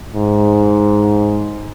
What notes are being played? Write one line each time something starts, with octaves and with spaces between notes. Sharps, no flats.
G#2